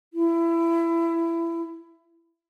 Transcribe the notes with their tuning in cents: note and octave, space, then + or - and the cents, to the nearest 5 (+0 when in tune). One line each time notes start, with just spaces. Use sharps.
E4 +20